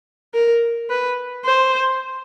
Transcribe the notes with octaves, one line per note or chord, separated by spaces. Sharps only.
A#4
B4
C5